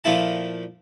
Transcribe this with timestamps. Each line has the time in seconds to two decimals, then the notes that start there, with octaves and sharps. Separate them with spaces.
0.04 A#2 F3 A3 E4 A5